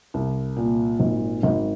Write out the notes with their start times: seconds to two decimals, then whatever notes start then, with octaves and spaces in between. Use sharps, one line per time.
0.14 C2
0.57 A#2
1.00 G#1
1.43 G#1